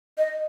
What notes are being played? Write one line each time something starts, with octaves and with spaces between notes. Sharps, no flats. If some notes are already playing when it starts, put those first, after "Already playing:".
D#5